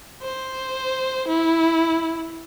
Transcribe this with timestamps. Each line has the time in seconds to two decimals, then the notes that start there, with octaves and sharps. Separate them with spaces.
0.22 C5
1.28 E4